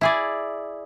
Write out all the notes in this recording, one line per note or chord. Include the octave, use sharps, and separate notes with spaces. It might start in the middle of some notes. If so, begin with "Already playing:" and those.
E4 G#4 D5